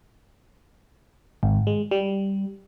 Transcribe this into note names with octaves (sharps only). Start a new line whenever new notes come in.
G#1
G#3
G3